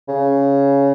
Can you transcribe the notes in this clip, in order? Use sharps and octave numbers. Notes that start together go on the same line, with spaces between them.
C#3